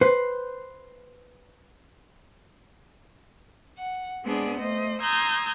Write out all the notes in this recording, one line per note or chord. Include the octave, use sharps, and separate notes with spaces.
B4 C5
F#5
G#3 B3 C4 D4 G#4
A3 C5 D#5
A#5 C6 D#6 E6 G6 G#6